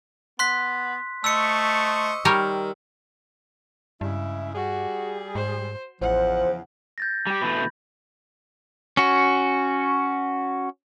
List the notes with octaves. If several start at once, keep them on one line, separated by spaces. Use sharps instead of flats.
B3 C6 F#6 B6
A3 C5 D#5 C#6 E6 C#7
D#3 G3 A#4 C#5
G2 C#3 G#3 E4
G3 F#4 G#4
G#2 C5
A1 E2 C#3 F3 C5 F#5
G6 A6 A#6
G3 G4
B2 E3 A3 B5
G6
C#4 F#4